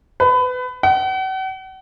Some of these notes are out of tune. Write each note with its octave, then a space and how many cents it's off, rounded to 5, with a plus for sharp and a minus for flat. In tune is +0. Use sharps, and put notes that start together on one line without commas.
B4 +25
F#5 +45